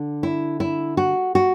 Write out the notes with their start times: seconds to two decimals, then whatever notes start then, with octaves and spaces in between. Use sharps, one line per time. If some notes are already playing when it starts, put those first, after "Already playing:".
Already playing: D3
0.23 E4
0.60 E4
0.97 F#4
1.35 F#4